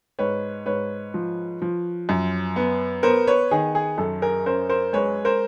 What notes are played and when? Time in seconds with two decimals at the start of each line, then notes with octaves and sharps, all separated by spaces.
0.19 G#2 B4 C#5
0.66 G#2 B4 C#5
1.14 F3
1.62 F3
2.09 F#2
2.56 B3
3.03 B3 A#4 C5
3.27 B4 C#5
3.51 D#3 G#4
3.75 G#4
3.98 F#2 A4
4.22 G#4 A#4
4.46 C#4 A#4 C5
4.69 A#4 C5
4.93 G#3 B4 C#5
5.25 A#4 C5